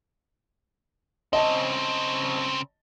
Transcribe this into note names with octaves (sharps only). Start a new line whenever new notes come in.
C#3 C4 D#5 A5